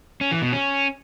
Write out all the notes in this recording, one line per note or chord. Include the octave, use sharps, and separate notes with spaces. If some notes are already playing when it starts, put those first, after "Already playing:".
C#4
E3
B2
C#4